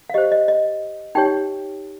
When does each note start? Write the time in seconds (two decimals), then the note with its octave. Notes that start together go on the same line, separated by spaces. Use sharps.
0.10 F5
0.14 G4 C5 D#5
0.32 D#5
0.48 D#5
1.15 D#4 G4 C#5 G5